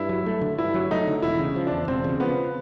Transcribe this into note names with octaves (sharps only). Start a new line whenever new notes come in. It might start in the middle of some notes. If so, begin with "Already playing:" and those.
Already playing: G2 E4
F#3
A3
D3
G2 E4
F#3
A3 D#4
D3
E1 E4
C#3
F3
E2 D4
E1 C4
C#3
F3 B3